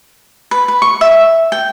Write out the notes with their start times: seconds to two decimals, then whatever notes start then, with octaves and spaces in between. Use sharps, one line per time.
0.51 B4
0.68 B4
0.82 C#6
1.01 E5
1.52 G5